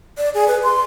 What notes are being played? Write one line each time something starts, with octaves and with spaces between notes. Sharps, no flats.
D5
G#4
B4
C6